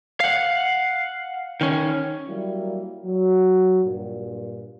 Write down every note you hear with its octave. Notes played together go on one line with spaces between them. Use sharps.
F5 F#5
D#3 C#4
F#3 G3 A#3 E4
F#3
G2 A#2